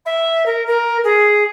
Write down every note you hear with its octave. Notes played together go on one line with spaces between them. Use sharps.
E5
A#4
A#4
G#4